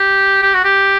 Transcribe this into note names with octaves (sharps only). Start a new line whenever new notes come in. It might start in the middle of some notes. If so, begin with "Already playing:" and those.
Already playing: G4
G4
F#4
G4